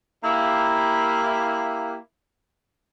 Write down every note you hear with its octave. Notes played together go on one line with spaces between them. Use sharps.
A#3 E4 G4